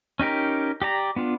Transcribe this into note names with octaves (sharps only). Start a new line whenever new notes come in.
C#4 D#4 G4 A#4
G4 D5 A#5
B3 D4 F4